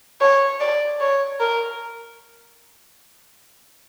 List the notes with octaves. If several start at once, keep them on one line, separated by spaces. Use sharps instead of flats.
C#5
D5
C#5
A#4